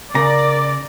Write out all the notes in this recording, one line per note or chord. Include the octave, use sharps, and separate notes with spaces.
C#3 A#4 D5 A#5